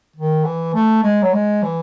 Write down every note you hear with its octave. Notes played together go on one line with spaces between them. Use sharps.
D#3
E3
A3
G#3
F#3
G#3
E3